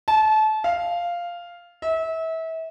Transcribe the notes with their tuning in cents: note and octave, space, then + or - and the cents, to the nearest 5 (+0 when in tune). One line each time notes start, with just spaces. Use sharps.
A5 -30
F5 -5
E5 -30